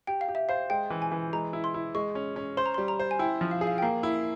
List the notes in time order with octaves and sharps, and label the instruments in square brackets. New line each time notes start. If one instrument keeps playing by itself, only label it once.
[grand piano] G4 [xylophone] G5
[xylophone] F5
[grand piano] G4
[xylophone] E5
[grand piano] C5 [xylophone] F5
[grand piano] G#3 [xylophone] G5
[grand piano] E3
[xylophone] G#5
[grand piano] E3
[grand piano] G#3 [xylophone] A#5
[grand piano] E4
[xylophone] C6
[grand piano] E4
[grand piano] G#3 [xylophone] C#6
[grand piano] C#4
C#4
[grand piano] C5 [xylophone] C6
[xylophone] A#5
[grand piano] G3 [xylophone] C6
[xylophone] A#5
[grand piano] C5
[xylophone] G#5
[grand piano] E4 [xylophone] G5
[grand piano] F3
[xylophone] F5
[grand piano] G#4
[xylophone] F5
G5
[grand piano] A#3 [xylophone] F5
[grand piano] E4